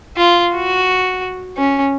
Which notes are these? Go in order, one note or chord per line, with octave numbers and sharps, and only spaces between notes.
F4
F#4
C#4